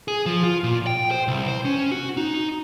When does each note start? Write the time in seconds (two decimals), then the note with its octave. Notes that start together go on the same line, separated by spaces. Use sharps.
0.08 G#4
0.26 F3
0.43 F4
0.64 A#2
0.86 G5
1.11 C5
1.28 C2
1.48 C5
1.65 C#4
1.92 F#4
2.17 D#4